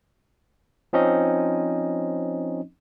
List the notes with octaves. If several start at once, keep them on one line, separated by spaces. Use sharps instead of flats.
F3 C4 C#4 D#4 D#5